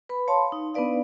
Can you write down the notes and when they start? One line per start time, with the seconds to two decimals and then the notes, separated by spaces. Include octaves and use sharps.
0.09 B4 B5
0.28 C#5 F5 A5 C6
0.52 D#4
0.74 B3 D4 D#4 B4 D5 F5